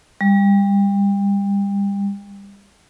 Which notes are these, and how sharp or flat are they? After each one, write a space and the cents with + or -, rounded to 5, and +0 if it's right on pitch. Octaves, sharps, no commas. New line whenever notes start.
G3 +30